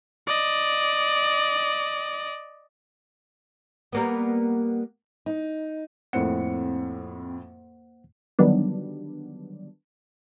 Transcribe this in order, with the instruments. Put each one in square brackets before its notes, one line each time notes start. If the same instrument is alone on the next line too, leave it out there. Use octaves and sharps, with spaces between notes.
[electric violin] D5 D#5
[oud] G3 A#3 B3
[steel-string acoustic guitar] D#4
[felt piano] F2 A2 C#7 [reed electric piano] A#3 C5 F#5 [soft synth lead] C4
[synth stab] D3 D#3 F#3 G3 B3 D4